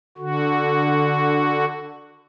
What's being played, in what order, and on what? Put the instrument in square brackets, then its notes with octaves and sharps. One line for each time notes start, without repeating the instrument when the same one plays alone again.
[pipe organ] D3 F#4